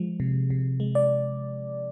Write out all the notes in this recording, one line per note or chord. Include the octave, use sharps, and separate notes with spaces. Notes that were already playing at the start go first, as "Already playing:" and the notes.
Already playing: F3 G#3
C3
C3
G#3
D5